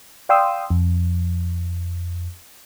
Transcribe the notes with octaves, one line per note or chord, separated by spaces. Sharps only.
D5 F5 G5 C6 D#6 E6
F2